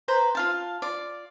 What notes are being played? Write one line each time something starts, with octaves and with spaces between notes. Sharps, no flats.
B4 C5 A#5
F4 F5 A5
F4 D5